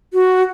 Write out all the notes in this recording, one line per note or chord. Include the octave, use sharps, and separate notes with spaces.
F#4